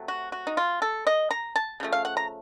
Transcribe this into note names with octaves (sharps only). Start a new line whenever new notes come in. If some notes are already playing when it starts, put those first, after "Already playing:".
Already playing: C3 F#3 A3
F#4
F#4
D#4
F4
A4
D#5
A#5
A5
C#3 F3 A3
F5
F#5
A#5